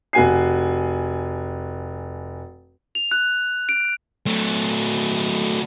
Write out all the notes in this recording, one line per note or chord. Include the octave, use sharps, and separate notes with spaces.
F1 F#4 G#5 C7
F7
F#6
D7
F#3 A3